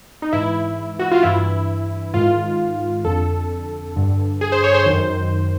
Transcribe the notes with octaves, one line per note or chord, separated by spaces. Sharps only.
D#4
G#2 E3 E4
F#4
F4
G2 E3 E4
G#2 D#3 F4
F2 D3 A4
G2 D3
G#4
C5
C#5
C5
F#2 D#3 C5